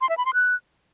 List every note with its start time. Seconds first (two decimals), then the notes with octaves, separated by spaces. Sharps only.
0.01 C6
0.09 E5
0.18 B5
0.26 C6
0.34 F#6